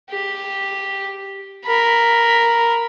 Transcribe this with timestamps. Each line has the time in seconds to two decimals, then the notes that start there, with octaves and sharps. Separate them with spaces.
0.10 G4
1.65 A#4 B5